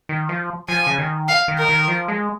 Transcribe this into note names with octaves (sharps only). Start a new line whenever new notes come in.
D#3
F3
F3 G#5
C#3
D#3
F5
D#3
A#4
D#3
F3
G#3